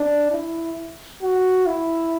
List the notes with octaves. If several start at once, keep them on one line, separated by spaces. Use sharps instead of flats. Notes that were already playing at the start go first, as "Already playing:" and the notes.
Already playing: D4
E4
F#4
E4